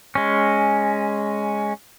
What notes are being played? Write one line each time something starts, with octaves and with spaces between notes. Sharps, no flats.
G#3 C#4